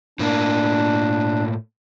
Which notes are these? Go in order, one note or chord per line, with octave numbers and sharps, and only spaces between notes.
A2 A#3 D4